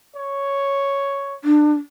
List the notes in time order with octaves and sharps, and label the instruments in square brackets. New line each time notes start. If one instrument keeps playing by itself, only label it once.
[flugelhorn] C#5
[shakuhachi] D4